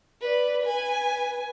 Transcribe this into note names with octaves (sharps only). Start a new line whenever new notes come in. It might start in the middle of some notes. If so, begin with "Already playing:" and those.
B4 D5
B4 G#5